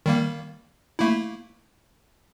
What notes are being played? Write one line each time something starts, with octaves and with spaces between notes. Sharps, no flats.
D#3 G3 A#3
A3 A#3 E4